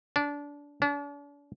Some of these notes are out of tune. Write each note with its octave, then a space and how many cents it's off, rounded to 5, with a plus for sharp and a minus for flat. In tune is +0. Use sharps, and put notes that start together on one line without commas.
D4 -20
D4 -40